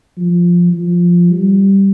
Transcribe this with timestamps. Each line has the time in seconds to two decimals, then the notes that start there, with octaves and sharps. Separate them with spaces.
0.17 F3
0.73 F3
1.30 G3